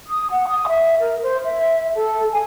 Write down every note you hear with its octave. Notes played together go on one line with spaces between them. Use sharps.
D#6
F#5
D#6
E5
A#4
C5
E5
A4
G#5